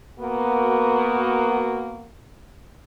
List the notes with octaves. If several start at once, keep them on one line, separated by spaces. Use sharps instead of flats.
A#3 B3 F#4